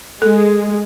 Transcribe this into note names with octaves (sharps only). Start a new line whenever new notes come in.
G#3 A4